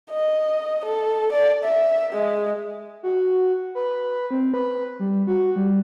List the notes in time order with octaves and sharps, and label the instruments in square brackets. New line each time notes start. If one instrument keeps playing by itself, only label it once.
[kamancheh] D#5
A4
D5
E5
G#3
[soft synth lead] F#4
B4
C4
B4
G3
F#4
G3